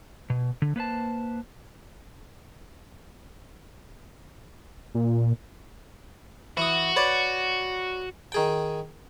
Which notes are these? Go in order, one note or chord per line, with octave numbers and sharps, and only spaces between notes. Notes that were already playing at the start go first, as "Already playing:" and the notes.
B2
D3
A#3 B4 C5 A5
A#2
E3 F#4 D#6
B4 C#5 D5
D#3 G#4 G5